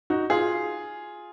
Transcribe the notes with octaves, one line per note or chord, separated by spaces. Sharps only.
D#4 F#4
F4 G#4